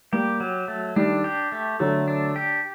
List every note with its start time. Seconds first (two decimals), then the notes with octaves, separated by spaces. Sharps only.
0.12 G3 A#3 G4
0.40 F#3
0.68 A3
0.96 D#3 G3 D4
1.24 G4
1.52 A3
1.80 D3 F#3 A3
2.08 D4
2.36 G4